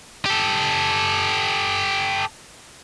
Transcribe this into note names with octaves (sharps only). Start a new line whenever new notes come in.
G4 A4